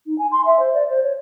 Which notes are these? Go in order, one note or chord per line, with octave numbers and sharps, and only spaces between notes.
D#4
G#5
C6
E5
C5
D5
C5
C#5